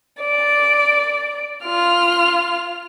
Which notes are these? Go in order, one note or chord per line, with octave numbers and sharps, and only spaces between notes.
D5
F4 F6